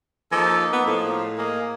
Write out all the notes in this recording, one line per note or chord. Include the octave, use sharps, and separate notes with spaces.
F3 A#3 D#4 G#4 A4
B3
A2 F3
A#3 G#4 D#5 G#5